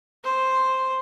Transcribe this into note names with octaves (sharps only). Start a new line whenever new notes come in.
C5